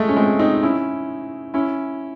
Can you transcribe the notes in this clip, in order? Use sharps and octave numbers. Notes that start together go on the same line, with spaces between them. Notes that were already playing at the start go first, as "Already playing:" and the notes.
Already playing: G#3 A3
C#4
G#3 C4
C4 D#4
C#4 E4
C#4 E4